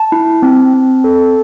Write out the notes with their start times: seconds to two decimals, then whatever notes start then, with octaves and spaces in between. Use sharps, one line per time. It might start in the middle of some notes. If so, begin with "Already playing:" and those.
Already playing: A5
0.12 E4
0.42 C4
0.73 C4
1.04 A4